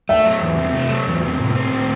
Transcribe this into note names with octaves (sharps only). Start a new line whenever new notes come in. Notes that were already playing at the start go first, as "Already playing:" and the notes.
A3 E5
F#3
E2
C3
A3
F#3
E2
C3
A2
C4
A2